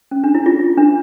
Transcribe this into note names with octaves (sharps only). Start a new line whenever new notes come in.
C#4
D4
E4
F4
D4